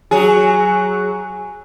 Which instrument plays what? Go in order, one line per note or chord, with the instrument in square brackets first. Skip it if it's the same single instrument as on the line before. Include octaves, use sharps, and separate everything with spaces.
[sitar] F#3 G#4